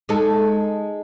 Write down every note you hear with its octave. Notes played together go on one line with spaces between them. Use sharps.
G#3 D#4 A4